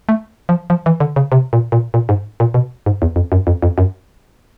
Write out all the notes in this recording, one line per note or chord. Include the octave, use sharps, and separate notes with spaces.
A3
F3
F3
E3
D3
C#3
C3
A#2
A#2
A#2
G#2
A#2
B2
G#2
E2
F2
F#2
F2
F2
F#2